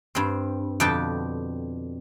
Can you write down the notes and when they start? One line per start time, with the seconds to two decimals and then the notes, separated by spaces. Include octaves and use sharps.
0.15 G2 C4
0.80 F2 B2 D3 G4 G5 A5